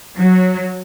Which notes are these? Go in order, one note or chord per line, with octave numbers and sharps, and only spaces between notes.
F#3